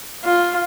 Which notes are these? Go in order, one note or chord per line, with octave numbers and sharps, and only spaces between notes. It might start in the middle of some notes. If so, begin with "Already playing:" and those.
F4